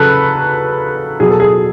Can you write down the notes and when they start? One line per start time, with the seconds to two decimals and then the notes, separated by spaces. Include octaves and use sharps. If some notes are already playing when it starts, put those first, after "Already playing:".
Already playing: C#3 F#3 A4 B4
1.20 B2 F#3 G#4
1.30 A4
1.40 G#4